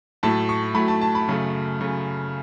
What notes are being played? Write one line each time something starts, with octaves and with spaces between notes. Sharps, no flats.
A2 F#3 A3 A5
C#6
A2 F#3 A3 B5
A5
A5
B5
F#2 C#3 A3
F#2 C#3 A3